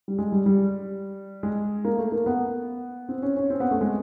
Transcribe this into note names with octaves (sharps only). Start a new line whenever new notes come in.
G3
G#3
G3
G3
G#3
A#3
A3
A#3
B3
C4
C#4
C#4
C4
B3
A3
G#3